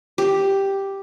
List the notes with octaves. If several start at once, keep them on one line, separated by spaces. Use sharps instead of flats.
G4